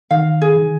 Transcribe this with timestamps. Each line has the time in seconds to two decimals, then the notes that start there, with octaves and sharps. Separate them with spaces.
0.11 D#3 F5
0.41 G#4
0.56 D#3